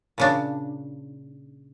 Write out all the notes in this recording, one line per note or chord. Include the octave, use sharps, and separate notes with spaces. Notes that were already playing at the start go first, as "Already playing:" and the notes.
A#2 C#3 D4